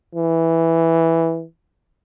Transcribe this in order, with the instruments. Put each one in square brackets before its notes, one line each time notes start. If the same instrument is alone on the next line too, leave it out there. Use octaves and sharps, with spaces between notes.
[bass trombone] E3